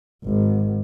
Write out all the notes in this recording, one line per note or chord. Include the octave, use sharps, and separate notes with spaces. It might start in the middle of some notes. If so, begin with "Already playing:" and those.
G#1